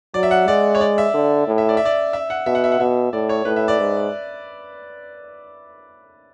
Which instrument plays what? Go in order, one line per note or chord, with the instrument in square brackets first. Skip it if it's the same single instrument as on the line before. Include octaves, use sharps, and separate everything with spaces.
[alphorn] F#3 [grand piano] D5
[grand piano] E5
F#5
[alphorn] G#3 [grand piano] D5
[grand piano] C#5
D5
E5
[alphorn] D3
A2
[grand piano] E5
D5
E5
D5
E5
F#5
[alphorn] B2 [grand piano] E5
[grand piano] F#5
E5
F#5
[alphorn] B2 [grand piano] E5
[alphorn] A2 [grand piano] D5
[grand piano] C#5
[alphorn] A2 [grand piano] B4
[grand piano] E5
D5
[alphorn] G#2